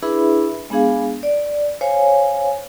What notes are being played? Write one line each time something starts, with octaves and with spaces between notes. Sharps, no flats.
D4 E4 G#4 B4 E5 B5
G#3 B3 D4 G#4 F5
D5
C5 C#5 F5 G#5